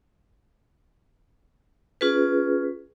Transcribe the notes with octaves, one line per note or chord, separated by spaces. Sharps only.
C#4 F4 G#4 B4